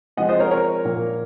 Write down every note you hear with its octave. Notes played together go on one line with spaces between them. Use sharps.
F3 G#3 C4 D#5 F#5
C5 D#5
A#4 C#5
A#4 C#5
A#2 F3 A#3